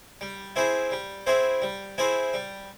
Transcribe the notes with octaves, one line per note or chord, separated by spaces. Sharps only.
G3
C4 E4 G#4 C5
G3
C4 E4 G#4 C5
G3
C4 E4 G#4 C5
G3